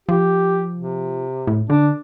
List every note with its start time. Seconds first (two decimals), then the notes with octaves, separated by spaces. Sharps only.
0.09 F3 G4
0.75 C3
1.47 A2
1.70 D3 D4